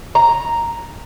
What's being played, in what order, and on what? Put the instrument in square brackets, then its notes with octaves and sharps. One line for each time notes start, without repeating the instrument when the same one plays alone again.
[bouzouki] A#5